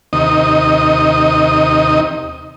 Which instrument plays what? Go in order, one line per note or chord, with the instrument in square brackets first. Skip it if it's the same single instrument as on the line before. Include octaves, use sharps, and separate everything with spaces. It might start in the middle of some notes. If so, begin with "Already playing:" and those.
[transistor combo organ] D#2 C3 D#3 D#4 D#5 D#6